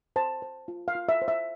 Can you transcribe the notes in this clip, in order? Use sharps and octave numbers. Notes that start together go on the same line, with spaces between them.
C5 A5
C5
F4
F5
F4
E5
C5
E5